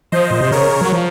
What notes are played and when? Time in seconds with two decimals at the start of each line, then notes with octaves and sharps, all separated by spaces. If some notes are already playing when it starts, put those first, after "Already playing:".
0.12 F3 C5 D#5
0.31 A#2
0.41 C3
0.51 C#3 A#4 C#5
0.81 F#3
0.92 F3